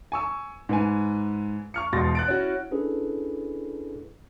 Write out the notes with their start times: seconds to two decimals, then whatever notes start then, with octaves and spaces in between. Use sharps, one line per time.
0.12 G#5 C#6 E6
0.69 G#2 B4 G#5
1.74 C#6 F6 C#7
1.93 E1 B2 C6 A6 A#6
2.15 F#6 A6 D7
2.28 C#4 E4 F#4
2.71 C#4 D4 E4 G#4 A4 B4